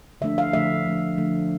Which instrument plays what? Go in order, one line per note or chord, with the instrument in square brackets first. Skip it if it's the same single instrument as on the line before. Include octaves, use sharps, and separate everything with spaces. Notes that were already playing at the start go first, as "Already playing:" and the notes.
[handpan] D3 F3 A3 D4 E5
F5
D3 F3 A3 D4 E5
D3 F3 A3 D4
D3 F3 A3 D4